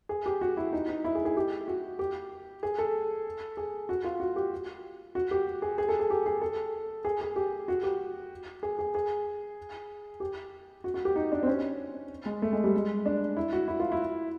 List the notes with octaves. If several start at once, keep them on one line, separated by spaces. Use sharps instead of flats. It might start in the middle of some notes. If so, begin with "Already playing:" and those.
G#4
G4
F#4
E4
D#4
D#4
E4
G#4
G#4
G4
F#4
G4
G#4
A4
G#4
F#4
F4
F#4
G4
F#4
G4
G#4
G#4
A4
G#4
G4
G#4
A4
G#4
G#4
G4
F#4
G4
G#4
G#4
G#4
G4
F#4
F#4
G4
D#4
D4
C4
C#4
G#3
A3
G#3
G3
G#3
D4
E4
F#4
E4
F4
E4